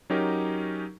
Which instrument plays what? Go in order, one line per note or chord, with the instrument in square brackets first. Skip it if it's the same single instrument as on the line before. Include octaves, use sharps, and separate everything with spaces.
[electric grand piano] F#3 C#4 D#4 G4 A#4